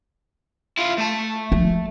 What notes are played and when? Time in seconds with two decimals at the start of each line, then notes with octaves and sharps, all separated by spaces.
0.78 E4 F4
0.98 A3 A5
1.52 F3